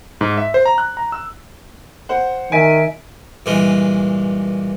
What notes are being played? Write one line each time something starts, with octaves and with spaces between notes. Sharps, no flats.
G#2
E5
C5
A#5
F#6
A#5
E6
C5 F#5
D#3 E5 G#5 B6 D7
G2 A#2 E3 G#3